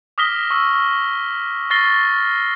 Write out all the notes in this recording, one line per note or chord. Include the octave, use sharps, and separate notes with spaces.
D6 D#6 F6 A#6 B6 G7
C#6 E6
C#6 F6 A6 A#6 C7 G7